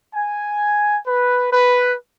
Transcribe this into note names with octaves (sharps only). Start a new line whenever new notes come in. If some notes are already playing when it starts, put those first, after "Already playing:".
G#5
B4
B4